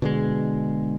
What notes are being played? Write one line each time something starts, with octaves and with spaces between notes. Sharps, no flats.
B2 D3 G#3